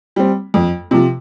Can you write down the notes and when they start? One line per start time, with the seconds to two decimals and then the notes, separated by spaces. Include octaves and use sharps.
0.16 G3 C4
0.54 F2
0.91 C3 F3